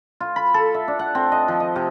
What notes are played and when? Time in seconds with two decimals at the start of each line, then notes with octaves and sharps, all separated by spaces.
0.20 F4
0.36 B5
0.54 A4
0.74 E5
0.88 D4
0.99 F#5
1.15 C4
1.32 D#5
1.48 F3
1.60 D#5
1.76 C3